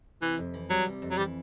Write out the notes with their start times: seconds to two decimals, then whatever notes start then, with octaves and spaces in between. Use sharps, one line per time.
0.22 C3 E3
0.38 F2
0.54 E3
0.70 F#3 G3
0.86 C3
1.02 F2
1.11 F#3
1.18 E3 G3